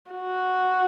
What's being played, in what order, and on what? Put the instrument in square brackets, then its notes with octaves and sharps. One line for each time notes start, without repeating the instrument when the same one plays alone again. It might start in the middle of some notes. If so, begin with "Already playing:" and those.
[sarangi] F#4